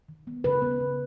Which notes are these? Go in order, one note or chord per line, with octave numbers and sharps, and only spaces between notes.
D#3
B3
C#3 B4
B3
C#3